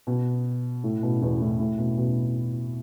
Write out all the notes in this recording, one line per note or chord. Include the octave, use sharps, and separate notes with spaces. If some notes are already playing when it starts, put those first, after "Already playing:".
B2
A2
B2
E2 E3
A2
A2
B2
B2